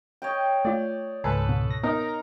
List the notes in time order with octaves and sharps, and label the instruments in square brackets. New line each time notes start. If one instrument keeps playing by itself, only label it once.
[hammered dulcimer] C#5 D#5 G5
[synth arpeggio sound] A3 F4 [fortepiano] D5
[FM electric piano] C#2 G#2 [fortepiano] A4 B4 [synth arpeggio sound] G#5
[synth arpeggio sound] B2
[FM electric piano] A#6
[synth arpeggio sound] B3 [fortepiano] D#4 A#4